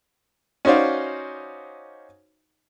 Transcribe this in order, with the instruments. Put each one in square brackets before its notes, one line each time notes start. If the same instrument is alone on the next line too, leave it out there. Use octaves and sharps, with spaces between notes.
[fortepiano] C#4 D#4 F#4 C5 D5 F5